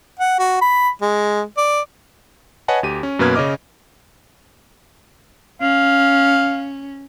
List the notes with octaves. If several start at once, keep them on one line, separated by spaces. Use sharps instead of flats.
F#5
F#4
B5
G#3
D5
B4 C#5 D#5 F#5 G#5 A5
D2 G4 D#7
C#4
F#2 B2 A#3 B4 F6 G#6
C#3 C#4 D#5 D6 F6
C#4 F5